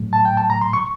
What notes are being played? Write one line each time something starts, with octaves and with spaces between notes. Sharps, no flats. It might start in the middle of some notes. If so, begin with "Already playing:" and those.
Already playing: A2 F#3 A3
A5
G5
A5
A#5
C6
C#6